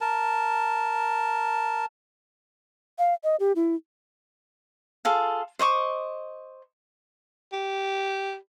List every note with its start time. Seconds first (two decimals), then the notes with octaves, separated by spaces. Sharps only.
0.01 A#4 A5
2.99 F5
3.24 D#5
3.40 G4
3.56 E4
5.05 F4 G#4 A4 F5
5.59 C5 D#5 C#6 D6
7.53 G4